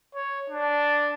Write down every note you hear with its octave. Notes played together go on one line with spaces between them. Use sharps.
C#5
D4